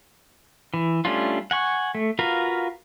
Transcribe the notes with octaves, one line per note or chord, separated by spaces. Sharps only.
E3
G3 A3 C#4 D4 F4
F#5 G#5 C#6
A3
F4 F#4 A#4 B4 F5